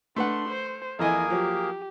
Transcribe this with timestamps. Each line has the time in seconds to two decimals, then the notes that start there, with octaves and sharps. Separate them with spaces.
0.16 A3 D4 B4 F#5 C6
0.49 C5
0.99 F2 E3 A#3 E4 G#4 A#4 D#5 G#5
1.30 F3 F#3 G4